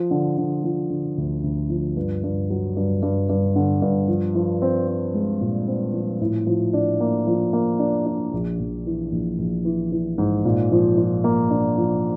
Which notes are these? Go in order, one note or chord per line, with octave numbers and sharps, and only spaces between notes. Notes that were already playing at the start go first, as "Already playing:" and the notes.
Already playing: F3
D3
D3
F3
D3
D2
D2
F3
G2
G2
F#3
G2
G2
G2
D3
G2
F3
F3
C4
C4
G#3
A#2
C4
F3
A2
F3
D4
A#3
F3
A#3
D4
D4
A#1
A#1
E3
A#1
A#1
E3
E3
G#2
A#2
F3
F3
A#3
D4
F3